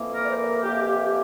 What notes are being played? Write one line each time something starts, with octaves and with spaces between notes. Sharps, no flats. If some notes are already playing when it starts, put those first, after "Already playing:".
Already playing: F2 E3 A#3
A#4
D5
C5
A#4
F2 E3 A#3 G4
G4